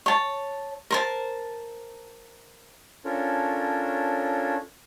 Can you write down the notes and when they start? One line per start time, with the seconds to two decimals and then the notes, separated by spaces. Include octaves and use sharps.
0.06 C#5 A5
0.91 A#4 C5 A5
3.05 C#4 D4 F4 A4 A#4 C#5